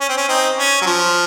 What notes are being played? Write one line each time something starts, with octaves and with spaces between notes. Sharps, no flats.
C#4
C4
C#4
C4 D#4
C#4
F#3
F3